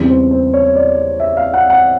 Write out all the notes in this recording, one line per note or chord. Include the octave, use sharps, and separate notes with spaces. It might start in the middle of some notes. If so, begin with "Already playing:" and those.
Already playing: E2 C#3 E3 G3 C4
C5
C5
C#5
D5
E5
F5
F#5
F#5